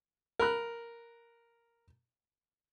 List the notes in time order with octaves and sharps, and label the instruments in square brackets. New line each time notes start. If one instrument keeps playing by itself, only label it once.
[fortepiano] A#4 B5 F#6